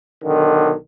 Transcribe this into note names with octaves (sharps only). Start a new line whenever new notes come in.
B1 D3 D#3